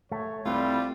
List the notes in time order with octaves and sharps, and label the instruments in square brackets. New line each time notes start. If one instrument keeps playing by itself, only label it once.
[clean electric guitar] A3 [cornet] C#5
[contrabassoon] C2 [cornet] G3 [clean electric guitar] A3 B4 [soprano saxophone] F4